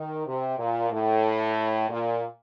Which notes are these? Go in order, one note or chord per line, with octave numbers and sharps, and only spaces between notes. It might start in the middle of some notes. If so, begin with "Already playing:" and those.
Already playing: D#3
C3
A#2
A2
A#2